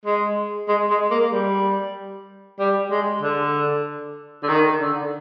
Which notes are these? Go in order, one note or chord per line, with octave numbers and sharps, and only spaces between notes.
G#3
G#3
G#3
A#3
G3
G3
G#3
D3
D3
D#3
D3